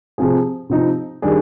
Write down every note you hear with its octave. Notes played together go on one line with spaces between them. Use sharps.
C3 F3 C4 F4 G#4
C3 F3 C4 D#4
D#3 G3 D4 G#4